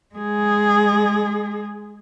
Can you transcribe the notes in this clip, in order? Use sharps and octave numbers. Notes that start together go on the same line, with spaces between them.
G#3 G#4